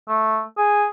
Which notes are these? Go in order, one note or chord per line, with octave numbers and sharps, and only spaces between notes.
A3
G#4